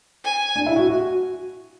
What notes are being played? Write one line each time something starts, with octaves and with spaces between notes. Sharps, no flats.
G#5
D4
E4
F#4
F#4